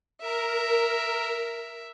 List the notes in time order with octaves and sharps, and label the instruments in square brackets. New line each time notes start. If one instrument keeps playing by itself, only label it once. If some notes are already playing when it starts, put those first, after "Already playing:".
[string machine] A#4 [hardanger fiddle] E5